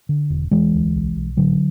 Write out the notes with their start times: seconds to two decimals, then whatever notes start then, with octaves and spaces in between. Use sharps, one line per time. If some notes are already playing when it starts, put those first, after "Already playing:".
0.09 D3
0.30 E1
0.51 E1 E3 G#3
0.73 D2
0.94 B1
1.16 B1
1.37 A2 D3 F#3